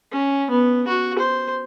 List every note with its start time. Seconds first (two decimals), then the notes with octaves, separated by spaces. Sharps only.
0.12 C#4
0.50 B3
0.88 F#4
1.19 C5